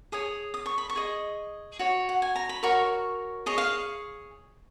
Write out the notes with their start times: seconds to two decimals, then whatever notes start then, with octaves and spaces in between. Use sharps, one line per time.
0.12 G#4 C#5 D#6
0.54 D#6
0.66 C#6
0.78 B5
0.90 C#6
0.96 G#4 D#5
1.79 F#4 C#5
2.09 F#5
2.22 G#5
2.36 A#5
2.49 B5
2.63 F#4 A#4 C#5 C#6
3.46 G#4 C#5 D#5
3.58 F5